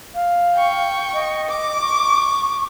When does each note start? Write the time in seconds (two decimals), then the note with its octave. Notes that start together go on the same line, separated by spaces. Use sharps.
0.15 F5
0.55 G5 C#6
1.14 D#5
1.49 D6
1.81 C#6